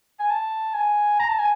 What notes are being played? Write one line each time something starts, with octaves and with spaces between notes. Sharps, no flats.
G#5
A5
G#5
A#5
A5
G#5